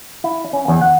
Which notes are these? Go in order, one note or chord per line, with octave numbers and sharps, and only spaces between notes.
E4
C#4
E2
F#5